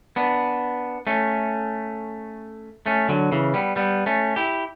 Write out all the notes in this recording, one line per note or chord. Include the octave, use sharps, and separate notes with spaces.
B3 D4
A3 C#4
A3 C#4
D3 F#3
C#3 E3
G3 B3
G3 B3
A3 C#4
E4 G4